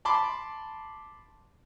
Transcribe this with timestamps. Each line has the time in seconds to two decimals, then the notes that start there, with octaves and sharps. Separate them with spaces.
0.05 A5 B5 C6 D6